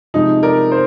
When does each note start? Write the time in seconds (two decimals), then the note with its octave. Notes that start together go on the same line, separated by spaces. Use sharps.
0.14 C3 F3 G#3 D#4
0.43 A#4 D5
0.72 C5